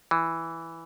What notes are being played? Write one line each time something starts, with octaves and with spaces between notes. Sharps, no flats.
E3